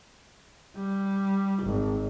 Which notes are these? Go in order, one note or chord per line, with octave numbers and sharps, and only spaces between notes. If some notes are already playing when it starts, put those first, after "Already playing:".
G3
G#1